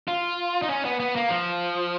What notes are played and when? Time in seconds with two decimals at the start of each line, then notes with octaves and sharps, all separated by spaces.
0.08 F4
0.62 D#4
0.69 C#4
0.85 B3
1.00 B3
1.16 A#3
1.30 F3